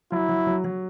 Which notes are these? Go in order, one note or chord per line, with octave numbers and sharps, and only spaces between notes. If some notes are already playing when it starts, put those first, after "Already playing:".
F#3 E4
F#3
F#3
F#3